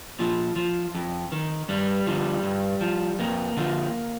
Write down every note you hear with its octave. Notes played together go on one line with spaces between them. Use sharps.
A#2 F3
F3
F2
D#3
G2 G3
D3 F3
G2
F3
F2 A#3
D3 F3